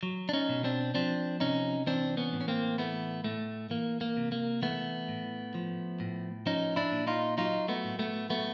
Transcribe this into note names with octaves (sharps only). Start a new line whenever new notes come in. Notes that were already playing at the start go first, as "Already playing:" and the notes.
F#3
D4
C#4 D#4
B2
C4 D4
F3 C4 D4
C3 C#4 D#4
E3 C4 D4
B3 C#4
A2
C#4
A#3 C4
E3 A3 B3
A2 A3
E3 A#3
A#3
C3
A#3
E3 A3 B3
A2
F3
A2
F3 C#4 D#4
D4 E4
A#2
D#4 F4
F#3 D#4 F4
A3 B3
A2
A3 B3
F#3 A3 B3